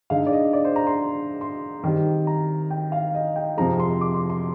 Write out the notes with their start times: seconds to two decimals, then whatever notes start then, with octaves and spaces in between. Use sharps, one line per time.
0.10 D3 G#3 D#4 F5
0.26 D5
0.33 D#5
0.53 D5
0.65 C5
0.76 A#5
0.87 C6
1.41 C6
1.84 D#3 G3 C4
2.27 A#5
2.71 G5
2.92 F5
3.15 D#5
3.36 G5
3.57 F2 C3 F3 G#3 A#5
3.80 C6
4.01 D6
4.15 C6
4.30 C6